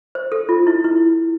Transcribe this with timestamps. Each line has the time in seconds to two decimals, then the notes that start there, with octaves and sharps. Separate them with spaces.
0.15 C5
0.32 A4
0.49 F4
0.67 E4
0.84 E4